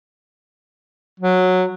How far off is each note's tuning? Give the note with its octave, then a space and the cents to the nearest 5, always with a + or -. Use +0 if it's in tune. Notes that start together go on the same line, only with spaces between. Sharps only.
F#3 -10